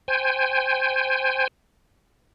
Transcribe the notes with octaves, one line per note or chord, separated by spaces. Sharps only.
C5 G5 G#5